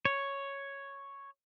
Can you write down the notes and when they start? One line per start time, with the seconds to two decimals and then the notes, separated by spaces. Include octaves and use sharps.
0.05 C#5